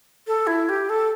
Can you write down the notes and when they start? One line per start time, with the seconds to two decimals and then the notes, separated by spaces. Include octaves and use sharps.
0.27 A4
0.47 E4
0.69 G4
0.89 A4